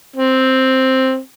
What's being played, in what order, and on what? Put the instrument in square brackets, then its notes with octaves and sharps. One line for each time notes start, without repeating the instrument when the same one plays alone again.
[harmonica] C4